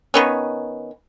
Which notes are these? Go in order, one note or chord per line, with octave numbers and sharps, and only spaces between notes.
D#3 B3 C#4